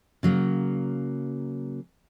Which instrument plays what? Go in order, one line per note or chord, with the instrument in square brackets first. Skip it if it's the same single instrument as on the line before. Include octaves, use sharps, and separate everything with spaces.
[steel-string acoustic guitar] C#3 F#3 A#3